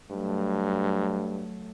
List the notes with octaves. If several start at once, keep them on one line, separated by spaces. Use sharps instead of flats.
G2 F#3 A3